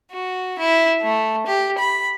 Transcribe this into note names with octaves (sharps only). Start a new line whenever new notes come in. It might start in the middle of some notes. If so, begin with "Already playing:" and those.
F#4
E4
A3
G4
B5